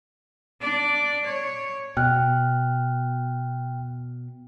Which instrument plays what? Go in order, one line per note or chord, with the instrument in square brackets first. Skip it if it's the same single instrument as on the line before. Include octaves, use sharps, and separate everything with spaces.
[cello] D4 D5
C#5
[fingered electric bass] B2 [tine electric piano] G5 F6 F#6